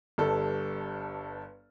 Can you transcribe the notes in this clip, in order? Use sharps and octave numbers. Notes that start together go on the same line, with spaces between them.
G1 G2 A4